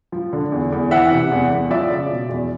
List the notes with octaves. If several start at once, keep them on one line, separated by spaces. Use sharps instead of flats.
F3
D3
E2
E2
E3 E5 F#5
C3
E2
E2
F3 D5 E5
C#3
B2
E2